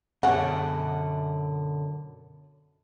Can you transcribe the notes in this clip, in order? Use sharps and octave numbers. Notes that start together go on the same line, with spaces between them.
F#2 B2 D3 G#3 C#4 C#5 F#5